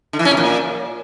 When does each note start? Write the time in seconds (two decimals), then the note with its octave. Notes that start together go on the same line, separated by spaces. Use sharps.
0.13 D3
0.19 E3
0.25 C#4
0.31 C3
0.37 A#2